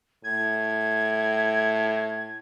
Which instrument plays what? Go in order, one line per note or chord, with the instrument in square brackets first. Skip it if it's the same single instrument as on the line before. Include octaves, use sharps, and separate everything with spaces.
[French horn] A2 [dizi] G#6